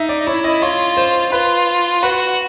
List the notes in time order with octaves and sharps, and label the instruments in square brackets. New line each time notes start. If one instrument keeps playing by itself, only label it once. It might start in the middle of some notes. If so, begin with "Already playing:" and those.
Already playing: [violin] D#4 [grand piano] E5
[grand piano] D5
[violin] E4 [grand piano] C#5
[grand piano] D#5
[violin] F4 [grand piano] C#5
[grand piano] C5
[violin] F4 [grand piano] B4
[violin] F#4 [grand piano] B4